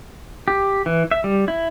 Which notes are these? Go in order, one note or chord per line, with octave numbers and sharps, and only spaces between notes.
G4
E3
E5
G3
E4